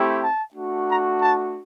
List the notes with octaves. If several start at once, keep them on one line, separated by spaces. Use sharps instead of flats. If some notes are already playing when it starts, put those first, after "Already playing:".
Already playing: A3 C4 E4 G4
A5
A3 D4 F#4
A#5
A5